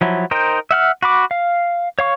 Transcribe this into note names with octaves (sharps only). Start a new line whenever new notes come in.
F3 F#3 E4
D#4 A#4 C5 G5
E5 F#5 F6
F#4 B5 D6
F5
C#5 F5 C#6